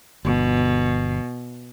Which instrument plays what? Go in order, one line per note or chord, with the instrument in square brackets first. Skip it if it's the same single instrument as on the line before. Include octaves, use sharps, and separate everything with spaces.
[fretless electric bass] G1 [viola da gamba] B2